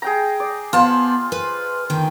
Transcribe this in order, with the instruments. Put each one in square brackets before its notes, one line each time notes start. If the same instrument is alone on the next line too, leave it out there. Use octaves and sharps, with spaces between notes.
[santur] G#4 G5 A#5
D5
[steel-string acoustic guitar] B3 A5 [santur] F4 C5
[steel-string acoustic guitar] B4
D2 D#3 G5